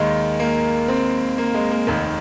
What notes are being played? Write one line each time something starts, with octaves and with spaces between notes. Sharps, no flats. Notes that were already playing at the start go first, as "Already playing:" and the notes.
Already playing: D#2 D#3 G#3
A#3
C4
A#3
G#3
A#3
F1 D#2 D#3